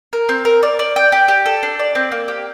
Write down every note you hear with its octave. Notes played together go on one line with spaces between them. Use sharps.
A#4
C4
A#4
D5
D5
G5
G4
G4
A4
D4
D5
C4
A#3
G4